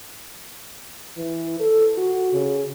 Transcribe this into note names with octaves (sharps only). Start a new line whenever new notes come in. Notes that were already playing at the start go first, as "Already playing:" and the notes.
E3
A4
F#4
C#3